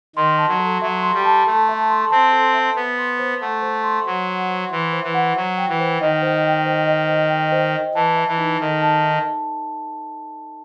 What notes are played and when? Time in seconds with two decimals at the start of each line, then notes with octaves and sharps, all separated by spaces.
0.16 D#3 C6
0.38 A5
0.48 F#3
0.59 A4
0.82 F#3 E5
1.03 C6
1.14 G3
1.25 A5
1.46 A3 A4
1.68 E5
1.90 C6
2.11 C4 A5
2.33 A4
2.54 E5
2.76 B3 C5
2.98 C6
3.19 C5
3.41 A3 F#5
3.62 C5
3.84 C6
4.06 F#3 C5
4.28 F#5
4.50 C5
4.71 E3 C6
4.93 C5
5.03 E3
5.14 F#5
5.36 F#3 C5
5.58 G5
5.69 E3
5.79 C5
6.00 D#3 D#5
6.22 C5
6.45 G5
6.66 C5
6.87 D#5
7.09 C5
7.30 G5
7.52 C5
7.74 D#5
7.95 E3 A5
8.16 E5
8.28 E3
8.38 D#4
8.60 D#3 A4
8.82 A5
9.04 E5